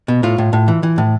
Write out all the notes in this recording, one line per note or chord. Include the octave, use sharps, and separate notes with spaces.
B2
A2 F4
A2
A2
E3
E3
A2